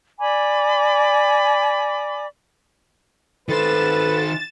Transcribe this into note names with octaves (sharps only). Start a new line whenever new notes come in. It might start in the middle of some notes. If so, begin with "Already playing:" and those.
D5 G#5 B5 D6
D#3 A4 B4 C5 A6 E7